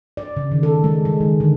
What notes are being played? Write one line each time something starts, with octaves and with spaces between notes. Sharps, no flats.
D5
C#3
D#3
A4
G#3
G#3
D#3
D3